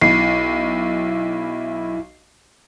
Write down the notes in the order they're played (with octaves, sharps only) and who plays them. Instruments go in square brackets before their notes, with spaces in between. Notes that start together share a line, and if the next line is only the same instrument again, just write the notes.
[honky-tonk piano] B1 [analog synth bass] E4 [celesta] C7